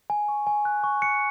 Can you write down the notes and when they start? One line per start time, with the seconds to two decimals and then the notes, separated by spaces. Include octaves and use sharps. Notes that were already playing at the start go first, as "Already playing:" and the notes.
0.10 G#5
0.28 C#6
0.47 G#5
0.65 F#6
0.84 C#6
1.02 F#6 C#7